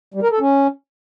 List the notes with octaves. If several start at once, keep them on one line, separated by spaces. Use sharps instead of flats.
G3
A#4
A4
C#4